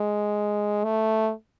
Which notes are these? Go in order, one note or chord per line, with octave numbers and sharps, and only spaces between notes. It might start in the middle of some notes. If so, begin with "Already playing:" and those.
Already playing: G#3
A3